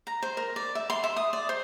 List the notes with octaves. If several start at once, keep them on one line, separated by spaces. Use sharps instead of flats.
A#5
C5
A#4
D5
E5
C6
E5
D#6
D5
C5